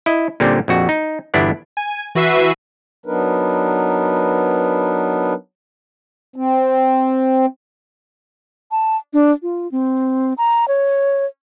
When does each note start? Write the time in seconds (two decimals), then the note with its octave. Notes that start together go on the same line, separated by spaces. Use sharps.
0.06 E4 D#5
0.40 A#2 D3 G3 C4 C#4
0.68 A#1 F2 F#4
0.89 D#4
1.34 G1 E2 B3 D4 E4 D5
1.77 G#5
2.15 E3 F#4 B4 E5 C7 D#7
3.06 F#3 B3 D4 D#4 A#4 B4
6.36 C4
8.71 A5
9.13 D4
9.42 F4
9.72 C4
10.38 A#5
10.68 C#5